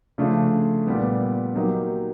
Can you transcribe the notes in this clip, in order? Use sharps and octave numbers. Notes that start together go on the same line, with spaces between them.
C#3 F3 A3 D4 F4
A#2 G3 B3
F#3 A#3 D#4 G4